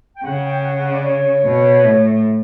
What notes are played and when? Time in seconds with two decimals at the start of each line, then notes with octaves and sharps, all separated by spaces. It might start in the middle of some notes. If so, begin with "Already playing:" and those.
0.17 G5
0.24 C#3 F#5
0.45 G5
0.64 F#5
0.78 F#5
0.91 D5
1.05 C#5
1.45 B2
1.84 A2